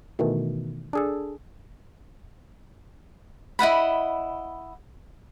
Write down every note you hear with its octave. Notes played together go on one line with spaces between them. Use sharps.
B2 D#3 E3 A3
D4 G#4 A4
E4 D#5 F#5 B5